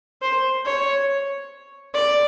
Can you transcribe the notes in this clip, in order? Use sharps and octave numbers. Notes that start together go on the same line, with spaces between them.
C5
C#5
D5